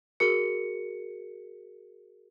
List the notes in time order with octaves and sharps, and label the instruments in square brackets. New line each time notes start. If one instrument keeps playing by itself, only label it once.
[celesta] F#4 G#4 A#4 C#7